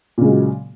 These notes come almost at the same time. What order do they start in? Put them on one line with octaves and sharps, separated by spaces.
A#2 C#3 G#3 F#3